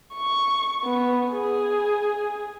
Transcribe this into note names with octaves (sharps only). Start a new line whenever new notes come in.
C#6
B3
G#4